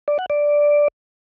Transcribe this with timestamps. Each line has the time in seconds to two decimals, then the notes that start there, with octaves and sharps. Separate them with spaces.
0.08 D5
0.19 F#5
0.30 D5